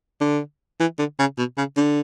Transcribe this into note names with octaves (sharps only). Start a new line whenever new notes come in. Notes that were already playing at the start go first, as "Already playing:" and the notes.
D3
E3
D3
C#3
B2
C#3
D3